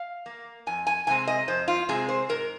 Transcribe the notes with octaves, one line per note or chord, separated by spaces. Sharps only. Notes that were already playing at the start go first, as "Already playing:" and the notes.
Already playing: F5
A#3
F2 G#5
G#5
C3 G#3 C4 G#5
D#5
F2 C5
F4
C3 G#3 C4 G#4
C5
G#2 A#4